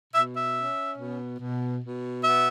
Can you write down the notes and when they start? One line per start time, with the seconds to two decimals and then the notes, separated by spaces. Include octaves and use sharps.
0.14 B2 E5
0.35 E5
0.57 C#4
0.98 B2
1.39 B2
1.82 B2
2.24 B3 E5